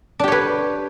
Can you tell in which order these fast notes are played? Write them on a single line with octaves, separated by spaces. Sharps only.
D4 G4 C#5 B4